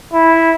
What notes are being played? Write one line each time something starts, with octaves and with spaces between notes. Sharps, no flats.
E4